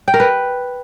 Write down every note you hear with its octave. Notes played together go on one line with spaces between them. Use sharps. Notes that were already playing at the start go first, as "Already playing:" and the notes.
G5
A#4
B4